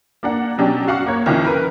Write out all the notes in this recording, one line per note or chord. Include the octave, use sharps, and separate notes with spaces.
A#3 D4 F#5
B2 F#3 C#4 D4 G4
F#4 F5 F#5 C#6
A#3 C#5
C2 D#3 F3 C#4 F6
A#4 B4